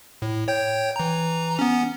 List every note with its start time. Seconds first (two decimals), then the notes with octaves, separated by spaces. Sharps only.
0.22 A2
0.48 C#5 G5 G6
0.96 E3 A#5
1.59 B3 C#4